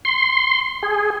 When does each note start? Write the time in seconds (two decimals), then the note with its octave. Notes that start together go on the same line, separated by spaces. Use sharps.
0.05 C6
0.83 G#4